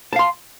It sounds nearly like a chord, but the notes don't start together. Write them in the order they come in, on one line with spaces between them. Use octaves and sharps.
A5 F5 C6